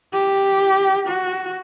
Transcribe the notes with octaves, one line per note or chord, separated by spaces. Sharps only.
G4
F#4